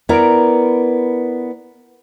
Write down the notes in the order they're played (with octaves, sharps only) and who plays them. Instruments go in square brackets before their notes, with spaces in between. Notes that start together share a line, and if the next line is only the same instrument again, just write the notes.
[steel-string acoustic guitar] B3 E4 A#4 D5 A#5